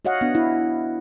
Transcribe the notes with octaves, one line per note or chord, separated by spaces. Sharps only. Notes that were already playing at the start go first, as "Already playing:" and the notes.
F#4 C#5 D#5 F5 F#5
B3 D4
E4